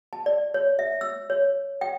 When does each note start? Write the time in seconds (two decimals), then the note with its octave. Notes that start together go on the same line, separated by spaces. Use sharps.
0.13 A5
0.26 D5
0.54 C#5
0.79 E5
1.01 E6
1.30 C#5
1.81 G5